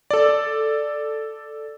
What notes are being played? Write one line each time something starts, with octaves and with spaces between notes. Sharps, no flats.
A4 D5